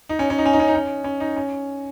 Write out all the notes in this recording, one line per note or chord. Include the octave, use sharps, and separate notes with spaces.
D#4
C#4
C#4
D#4
C#4
D#4
C#4
D#4
C#4
C#4
D#4
C#4